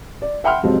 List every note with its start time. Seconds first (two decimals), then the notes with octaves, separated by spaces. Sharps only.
0.22 D5
0.44 E5 F#5 G5 B5 C6 F6
0.63 F2 G#2 C3 F3 F#3 C4